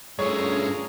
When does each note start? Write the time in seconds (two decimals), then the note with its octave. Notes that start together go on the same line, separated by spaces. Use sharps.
0.19 G2 A3 C#4 D4 F4 G#4 C#5 A#5